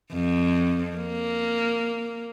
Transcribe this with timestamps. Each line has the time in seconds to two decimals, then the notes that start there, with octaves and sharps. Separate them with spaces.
0.13 F2
0.97 A#3